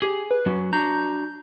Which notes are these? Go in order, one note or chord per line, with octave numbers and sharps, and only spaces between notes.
G4 G#4
B4
F#3 C#4 F#4
D4 F#4 A#5 G6